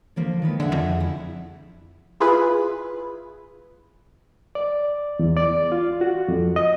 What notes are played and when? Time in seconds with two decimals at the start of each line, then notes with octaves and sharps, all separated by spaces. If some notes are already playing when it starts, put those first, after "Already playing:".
0.16 D3 F3 A#3
0.42 D#3 G#3 B4
0.60 D3 G#4 E5 F#5
0.72 F2
1.00 E4
2.20 E4 F4 G#4 B4
4.55 D5
5.19 E2
5.37 D5
5.72 F4
6.01 F#4
6.28 F2
6.56 D#5